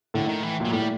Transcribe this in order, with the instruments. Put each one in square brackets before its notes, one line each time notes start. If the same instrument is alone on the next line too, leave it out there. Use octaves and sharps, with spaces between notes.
[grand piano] A2 [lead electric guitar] D3
[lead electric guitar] D#3
E3
[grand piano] A#2 [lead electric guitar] F#3
[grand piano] A2 [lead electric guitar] G3